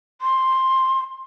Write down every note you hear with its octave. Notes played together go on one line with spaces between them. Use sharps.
C6